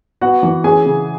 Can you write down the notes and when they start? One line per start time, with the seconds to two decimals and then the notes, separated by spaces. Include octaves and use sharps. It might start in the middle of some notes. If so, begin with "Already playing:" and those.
0.21 B3 F#4 F#5
0.43 E3
0.64 C#4 G#4 G#5
0.85 C#3